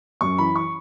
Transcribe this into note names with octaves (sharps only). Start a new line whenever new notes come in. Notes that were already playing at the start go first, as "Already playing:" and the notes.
F#2 C#6
E3 B5
C#6